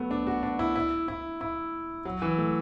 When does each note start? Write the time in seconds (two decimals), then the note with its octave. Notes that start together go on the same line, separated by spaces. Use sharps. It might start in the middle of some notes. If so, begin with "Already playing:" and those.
Already playing: F#3 A3 B3
0.11 D4
0.27 F#4
0.43 D4
0.59 E4
0.76 E4
1.08 E4
1.41 E4
2.05 F#3
2.22 E3
2.38 A3